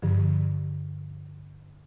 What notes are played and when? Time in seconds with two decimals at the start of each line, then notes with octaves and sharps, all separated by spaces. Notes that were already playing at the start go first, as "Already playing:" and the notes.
0.02 G2 D3 F3